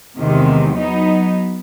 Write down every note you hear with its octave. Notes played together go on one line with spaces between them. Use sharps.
E2 C3 D#3 G#3
F#3 B3 D#4